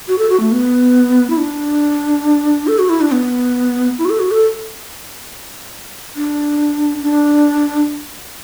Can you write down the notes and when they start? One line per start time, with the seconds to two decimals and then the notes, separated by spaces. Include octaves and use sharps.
0.08 F#4
0.18 A4
0.29 F#4
0.40 A3
0.52 B3
1.30 E4
1.38 D4
2.67 A4
2.79 F#4
2.89 E4
3.01 D4
3.12 B3
3.98 E4
4.05 F#4
4.10 A4
4.19 F#4
4.31 A4
6.16 D4
7.02 D4